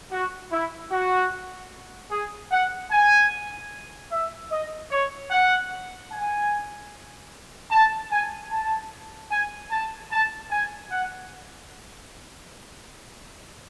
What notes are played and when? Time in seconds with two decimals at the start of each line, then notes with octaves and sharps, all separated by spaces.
0.12 F#4
0.51 E4
0.92 F#4
2.11 G#4
2.51 F#5
2.91 G#5
4.11 E5
4.51 D#5
4.91 C#5
5.31 F#5
6.12 G#5
7.71 A5
8.11 G#5
8.51 A5
9.31 G#5
9.71 A5
10.11 A5
10.51 G#5
10.91 F#5